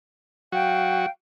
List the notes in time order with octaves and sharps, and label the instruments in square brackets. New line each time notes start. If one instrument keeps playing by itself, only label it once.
[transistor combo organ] F#3 F#4 [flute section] F5 G5